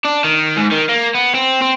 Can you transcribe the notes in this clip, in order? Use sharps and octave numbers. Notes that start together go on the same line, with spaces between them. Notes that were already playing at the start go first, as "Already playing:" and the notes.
D4
D#3
G#2
D#3
A#3
B3
C4
C4